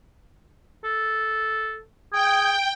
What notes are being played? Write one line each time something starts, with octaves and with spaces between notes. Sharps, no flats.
A4
G#4 G5